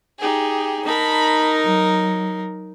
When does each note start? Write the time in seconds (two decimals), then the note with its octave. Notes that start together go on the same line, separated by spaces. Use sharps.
0.19 D#4 G4 G#4
0.85 D#4 A#4 A5 B5
1.62 F#3